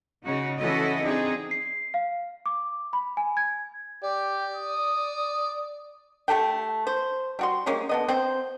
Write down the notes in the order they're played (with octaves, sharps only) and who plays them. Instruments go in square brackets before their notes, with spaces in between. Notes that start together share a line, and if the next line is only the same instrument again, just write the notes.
[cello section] C#3 D#4 F#4
E3 C#4 E4 F#4 A4 D#5
C4 D4 D#4 G#4
[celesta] C7
F5
D6
B5
G#5
G#6
[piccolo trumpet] G4 [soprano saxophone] D5
[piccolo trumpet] D#6
[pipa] A3 G4 A4 G5
C5
G3 F#4 C6
G3 G#3 A#3 C#4
D3 B3 D#5
C4 C5